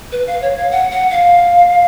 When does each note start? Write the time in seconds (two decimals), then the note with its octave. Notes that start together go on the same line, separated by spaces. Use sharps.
0.12 B4
0.27 F5
0.42 C#5
0.56 F5
0.71 F#5
0.91 F#5
1.11 F5